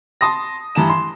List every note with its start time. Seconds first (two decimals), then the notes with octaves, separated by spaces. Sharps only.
0.21 A5 C6 D#6 A#6
0.75 G2 E3 A5 A#5 E7
0.90 C6